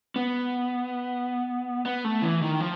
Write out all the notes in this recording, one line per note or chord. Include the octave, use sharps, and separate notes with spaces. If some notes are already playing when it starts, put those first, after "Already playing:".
B3
B3
A3
E3
D#3
F3